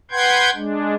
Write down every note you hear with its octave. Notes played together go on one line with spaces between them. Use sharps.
B4 F#5 G5 C6 G6 G#6
G#3 D4